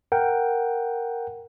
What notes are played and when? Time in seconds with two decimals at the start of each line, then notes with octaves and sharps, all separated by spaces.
0.12 A#4 F#5 G5